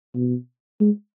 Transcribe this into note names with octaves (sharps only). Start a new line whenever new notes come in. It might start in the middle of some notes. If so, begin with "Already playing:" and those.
B2
G#3